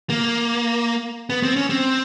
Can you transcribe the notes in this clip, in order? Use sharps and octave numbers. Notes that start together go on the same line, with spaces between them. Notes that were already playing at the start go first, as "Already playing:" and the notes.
A#3
B3
C4
C#4
C4